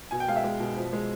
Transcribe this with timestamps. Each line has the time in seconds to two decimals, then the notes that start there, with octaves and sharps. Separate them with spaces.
0.11 B2 G#5
0.20 G5
0.28 G#3 F5
0.36 E5
0.44 G#3
0.60 B2
0.77 F3
0.93 G#3